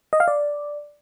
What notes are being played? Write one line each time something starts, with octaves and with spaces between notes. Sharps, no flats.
D#5
F5
D5